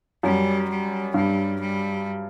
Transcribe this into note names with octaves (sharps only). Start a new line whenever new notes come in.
F#2 G3
G3
G2 G3
G3